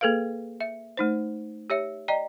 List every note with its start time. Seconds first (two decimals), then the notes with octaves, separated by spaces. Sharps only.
0.01 A#3 G#4 A4 B4 F5
0.61 E5
0.97 A3 D#4 C5
1.70 G4 C#5 E5
2.08 D5 D#5 G5 A#5